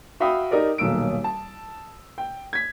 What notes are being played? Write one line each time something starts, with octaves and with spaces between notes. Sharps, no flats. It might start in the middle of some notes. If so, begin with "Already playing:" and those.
F#4 E5 F5 G5 B5 D#6
D#4 G4 A#4 D5
D#1 B1 A#3 E6 D7
A5
G5
G#6 B6